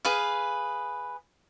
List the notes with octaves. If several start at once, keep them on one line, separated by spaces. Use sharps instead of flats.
G#4 B4 F5